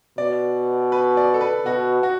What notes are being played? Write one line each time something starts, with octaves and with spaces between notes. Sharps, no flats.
B2 D5
B4
D5
A4
B4
B2 F#4
F#4